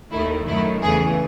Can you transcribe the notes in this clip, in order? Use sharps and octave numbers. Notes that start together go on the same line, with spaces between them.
D#2 D#3 A3 E4
F#2 D#3 F#3 A3 E4
E2 C#3 E3 A3 G#4